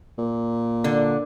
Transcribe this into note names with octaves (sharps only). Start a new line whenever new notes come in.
A#2
D3